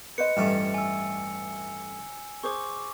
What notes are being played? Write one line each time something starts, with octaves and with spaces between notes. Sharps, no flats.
B4 C5 D#5 C#7
A1 G2 A3
G#5 E6
G#4 C5 C#6 D6